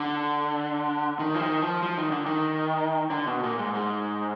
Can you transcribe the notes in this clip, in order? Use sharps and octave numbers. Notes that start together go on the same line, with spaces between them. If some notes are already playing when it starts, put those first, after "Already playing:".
Already playing: D3
D#3
F3
D#3
F3
F3
D#3
D3
D#3
D3
B2
A#2
G#2
G#2